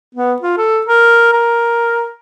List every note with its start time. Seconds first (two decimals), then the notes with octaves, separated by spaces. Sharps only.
0.15 B3
0.42 F4
0.57 A4
0.86 A#4
1.33 A#4